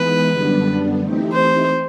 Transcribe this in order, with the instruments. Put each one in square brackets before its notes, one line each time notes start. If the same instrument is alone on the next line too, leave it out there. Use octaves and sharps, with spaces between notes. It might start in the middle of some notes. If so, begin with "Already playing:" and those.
Already playing: [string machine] E3 G#3 B3 D#4 [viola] B4
[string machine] F#2 D3 G3 B3 D4
E3 A3 C4 D#4 G4
[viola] C5